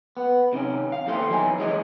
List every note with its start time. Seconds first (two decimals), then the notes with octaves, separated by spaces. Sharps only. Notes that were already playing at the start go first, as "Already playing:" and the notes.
0.17 B3
0.53 C3 D#3 C#4
0.92 F5
1.06 D#2 A2 A3 G4 C5
1.29 E2 G2 F#3 D#4 E4 G#5
1.58 E3 G#3 G#4 C#5 D#5